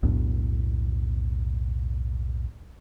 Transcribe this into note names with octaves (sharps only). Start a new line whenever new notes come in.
B1 E2 A2 D4